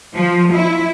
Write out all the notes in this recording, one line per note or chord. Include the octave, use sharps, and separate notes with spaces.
F3
E4